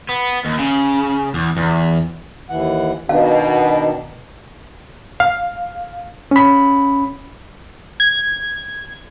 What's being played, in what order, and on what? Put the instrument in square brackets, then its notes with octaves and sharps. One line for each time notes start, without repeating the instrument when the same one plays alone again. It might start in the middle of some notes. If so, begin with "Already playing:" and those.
[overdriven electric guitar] B3
D#2
C#3
E2
E2
[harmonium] D#2 E3 F#5
[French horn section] B2 [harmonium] D#3 D4 [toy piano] F5
[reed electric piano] F5
C#4 B5
[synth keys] G#6